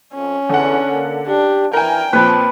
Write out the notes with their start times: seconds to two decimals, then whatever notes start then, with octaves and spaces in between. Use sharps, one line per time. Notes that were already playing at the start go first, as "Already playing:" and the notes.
0.14 F2 C#4
0.50 E2 D3 F#5
0.91 A#3
1.27 D4 G4
1.73 E3 A#4 G5 G#5
2.13 A#2 F3 C4 B4